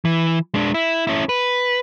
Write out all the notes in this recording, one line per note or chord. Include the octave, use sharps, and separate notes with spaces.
E3
G#3 D4
E4
C#4 E4
B4